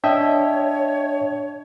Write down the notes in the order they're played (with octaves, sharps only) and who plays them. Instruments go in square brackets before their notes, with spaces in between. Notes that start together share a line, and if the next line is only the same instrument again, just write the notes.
[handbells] D4 [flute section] C#5 [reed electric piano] D#5 E5 G5